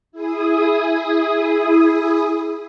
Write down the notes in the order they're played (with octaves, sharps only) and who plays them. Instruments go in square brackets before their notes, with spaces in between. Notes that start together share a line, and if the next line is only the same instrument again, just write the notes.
[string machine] E4 G#4 D#6